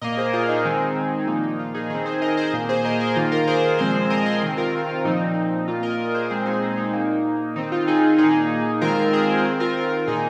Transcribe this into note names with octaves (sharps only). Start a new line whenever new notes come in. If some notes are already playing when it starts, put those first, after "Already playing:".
A#2 A#3 A#4 D#5
G#4 C5
F4 A#4
D#4 G#4
D#3 G#3 C4
A#2 F3 A#3 D#4
D#4
F4
D#4 G#4
D#3 C4 D#4 G#4
G#4 C5
A#4 D#5
G#4 C5
A#2 A#3
G#4 C5
A#4 D#5
G#4 C5
D#3 A#3 F4
F4 A#4
G#4 C5
A#2 F3 G#3 C4 G#4 C5
A#4 D#5
G#4 C5
C3 D#3 C4
F4 A#4
F4
A#2 F3 C4 D#4
A#2 A#3 F4
A#4 D#5
G#4 C5
A#2 G#3 C4 G#4 C5
D#4 G#4
D#4
D#4
A#2 A#3
D#3 C4 D#4
F4
D#4 G#4
A#2 A#3 D#4 G#4
D#3 G#3 C4 F4 A#4
G#4 C5
D#3 C4
F4 A#4
A#2 A#3 D#4 G#4